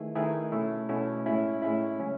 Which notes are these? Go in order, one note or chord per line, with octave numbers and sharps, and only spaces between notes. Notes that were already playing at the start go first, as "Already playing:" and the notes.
Already playing: D#3 A3 E4 G#4 B4
D#3 A3 E4 G#4 B4
B2 A3 C#4 E4
B2 A3 C#4 E4
A2 G#3 C#4 E4
A2 G#3 C#4 E4
C#3 F#3 C#4